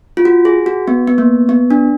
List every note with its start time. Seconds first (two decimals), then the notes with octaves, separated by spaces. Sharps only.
0.17 F4
0.25 F#4
0.45 G#4
0.66 F#4
0.88 B3
1.08 B3
1.18 A#3
1.49 B3
1.71 D4